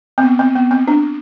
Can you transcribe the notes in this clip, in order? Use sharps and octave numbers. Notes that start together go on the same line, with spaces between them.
C4
B3
C4
B3
C4
D4